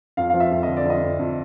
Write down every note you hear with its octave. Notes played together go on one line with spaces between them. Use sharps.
F2 F5
F3 F5
E5
F2
D3 D#5
D5
F2 D#5
F2
F2